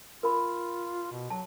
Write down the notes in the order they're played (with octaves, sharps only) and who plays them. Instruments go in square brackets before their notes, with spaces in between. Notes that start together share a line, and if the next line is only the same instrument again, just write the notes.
[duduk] F4 [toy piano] A#4 B5
[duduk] B2
[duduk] F#3 [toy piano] A5